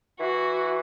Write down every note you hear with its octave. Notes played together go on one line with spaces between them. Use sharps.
E3 F#4